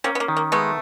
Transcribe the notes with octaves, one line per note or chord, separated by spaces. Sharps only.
A#3 C4 C#4
B3
A#3
D#3
A#3
G#3 A3 B3